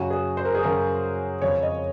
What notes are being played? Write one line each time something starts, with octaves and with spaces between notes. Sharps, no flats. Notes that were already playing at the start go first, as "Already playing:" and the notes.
Already playing: F#2 C#3 F#4
G#4
C5
A#4
G#4
F#2 C#3 A#4
F2 C#3 C#5
D#5